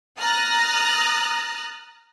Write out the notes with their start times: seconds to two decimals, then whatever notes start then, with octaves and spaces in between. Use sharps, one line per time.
0.19 A#5 D#6 F6 F#6 A6 A#6